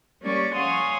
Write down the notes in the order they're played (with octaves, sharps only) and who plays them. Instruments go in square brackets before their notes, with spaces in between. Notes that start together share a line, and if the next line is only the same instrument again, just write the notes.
[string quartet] G3 A#3 C#4 G4 D5 C#6
C#5 F5 F#5 G#5 C6 D#6